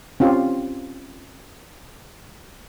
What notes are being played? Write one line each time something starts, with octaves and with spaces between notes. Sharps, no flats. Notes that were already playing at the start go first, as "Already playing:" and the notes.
C4 C#4 F4 G4